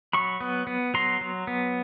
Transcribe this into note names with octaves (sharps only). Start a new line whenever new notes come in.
F#3 B5 C#6
B3
B3
F#3 A#5 C6
F#3
B3